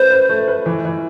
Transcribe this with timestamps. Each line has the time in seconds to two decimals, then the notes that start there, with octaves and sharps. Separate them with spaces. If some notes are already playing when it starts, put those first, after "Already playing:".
Already playing: A3 C#4 B4 C5
0.10 B4
0.29 A3
0.48 B4
0.66 E3
0.85 E3